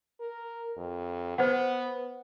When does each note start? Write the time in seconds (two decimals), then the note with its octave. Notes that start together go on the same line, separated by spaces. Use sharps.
0.20 A#4
0.77 F2
1.38 B3 C5 F#5